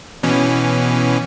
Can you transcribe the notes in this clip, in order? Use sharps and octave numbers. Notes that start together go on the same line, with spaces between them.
B2 E3 C#4